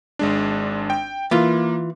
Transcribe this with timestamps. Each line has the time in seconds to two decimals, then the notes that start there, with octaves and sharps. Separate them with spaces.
0.19 G#1 G#3 D4
0.90 G5
1.31 E3 A#3 F4